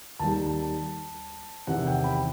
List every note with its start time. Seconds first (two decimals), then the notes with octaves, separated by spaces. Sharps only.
0.19 D#2 D#3 G3 A5
1.67 E2 C3 D#3 F#5
1.87 G5
2.04 B5